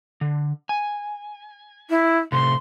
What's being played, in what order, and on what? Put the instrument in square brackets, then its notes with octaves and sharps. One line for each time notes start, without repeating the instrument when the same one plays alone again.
[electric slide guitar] D3
G#5
[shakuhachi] E4
[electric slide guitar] A2 C3 A3 [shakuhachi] C6